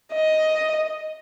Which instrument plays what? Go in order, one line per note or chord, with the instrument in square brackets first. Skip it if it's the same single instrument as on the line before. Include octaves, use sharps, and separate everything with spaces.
[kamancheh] D#5